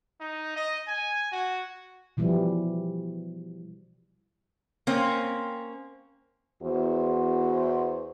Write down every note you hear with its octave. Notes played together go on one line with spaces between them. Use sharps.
D#4
D#5
G#5
F#4
B2 E3 F3 G3
A#3 C4 C#4
E2 F#4 C5